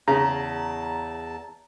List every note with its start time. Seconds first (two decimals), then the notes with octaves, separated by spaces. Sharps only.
0.08 E2 C#3 A5 A#5